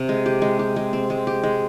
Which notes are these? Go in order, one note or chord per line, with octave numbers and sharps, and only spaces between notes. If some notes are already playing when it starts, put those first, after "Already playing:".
Already playing: C3
G#3
G4
G#3
G4
G#3
C4
G#3
G4
G#3